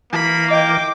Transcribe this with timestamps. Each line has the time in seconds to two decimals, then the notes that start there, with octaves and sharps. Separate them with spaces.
0.13 E3 A#3 B5
0.50 D#5 G5 D6